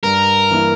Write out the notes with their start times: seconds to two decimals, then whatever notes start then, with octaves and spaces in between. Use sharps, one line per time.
0.03 G2 A#4
0.50 E3 A#3 E4